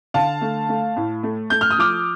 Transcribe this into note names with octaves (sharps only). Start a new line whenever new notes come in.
D3 F5 A5
A3
A3
A2
A3
A3 G6
F6
D#6
F3 D6 F6